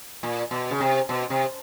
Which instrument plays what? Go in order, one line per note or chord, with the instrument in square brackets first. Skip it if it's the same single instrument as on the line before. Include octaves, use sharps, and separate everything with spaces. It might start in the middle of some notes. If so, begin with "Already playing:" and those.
[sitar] A#2
B2
C#3
C3
B2
C3